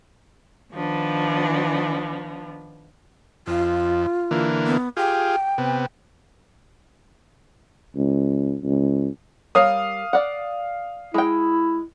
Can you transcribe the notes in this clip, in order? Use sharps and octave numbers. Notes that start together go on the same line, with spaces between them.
D#3 F3 B3 D4
F2 F4
D3 E3 A#3
B3
F4 G4 G#4 G5
C3 B3
C#2
C#2
G3 A#4 C#5 F5 D#6
D5 F#5
G#3 E4 G5